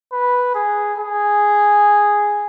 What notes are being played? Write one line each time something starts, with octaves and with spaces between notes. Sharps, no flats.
B4
G#4
G#4